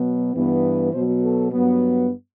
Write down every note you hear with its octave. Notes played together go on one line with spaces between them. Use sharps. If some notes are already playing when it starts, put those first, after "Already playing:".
Already playing: B2 F#3 B3
G2 E3 B3
B2 F#3 B3 C5
A4
G2 F#3 B3